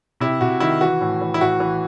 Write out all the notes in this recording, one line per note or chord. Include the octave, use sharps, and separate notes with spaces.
C3 E4
C3 F#4
D#3 E4
E3 F#4
A2
E3
E4
A2 F#4
E3